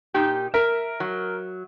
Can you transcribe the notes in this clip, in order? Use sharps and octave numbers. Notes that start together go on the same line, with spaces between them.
A#2 D#4 G4
A#4 E5
F#3